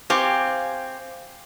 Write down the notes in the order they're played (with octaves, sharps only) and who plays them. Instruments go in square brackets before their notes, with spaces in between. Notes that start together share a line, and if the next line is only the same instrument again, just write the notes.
[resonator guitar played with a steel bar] C4 G4 [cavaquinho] F5 G#5 C#6